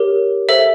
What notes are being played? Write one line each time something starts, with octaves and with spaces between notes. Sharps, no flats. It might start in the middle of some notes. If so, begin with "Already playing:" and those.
Already playing: G4 A#4 C#5
A4 C5 E5